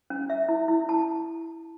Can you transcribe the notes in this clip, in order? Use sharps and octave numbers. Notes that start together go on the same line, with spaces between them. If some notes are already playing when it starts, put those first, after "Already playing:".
C#4
E5
E4
E4
A5